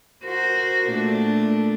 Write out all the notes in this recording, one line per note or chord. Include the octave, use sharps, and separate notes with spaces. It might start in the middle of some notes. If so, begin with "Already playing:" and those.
F#4 A#4 C5
A#2 A3 D4